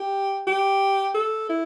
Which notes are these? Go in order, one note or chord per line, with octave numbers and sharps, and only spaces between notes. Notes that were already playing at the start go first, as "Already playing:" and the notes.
Already playing: G4
G4
A4
E4